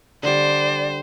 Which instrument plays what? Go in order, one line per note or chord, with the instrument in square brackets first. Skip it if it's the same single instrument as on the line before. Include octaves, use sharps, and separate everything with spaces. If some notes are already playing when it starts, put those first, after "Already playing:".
[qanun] D3 G3 [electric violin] C5 [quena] D5